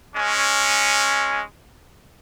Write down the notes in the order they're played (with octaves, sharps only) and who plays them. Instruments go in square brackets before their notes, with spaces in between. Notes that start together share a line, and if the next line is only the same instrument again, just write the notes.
[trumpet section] G#3 C#4